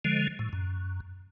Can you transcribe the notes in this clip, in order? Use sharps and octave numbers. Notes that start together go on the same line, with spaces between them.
D3 F3 G#3
A2
F#2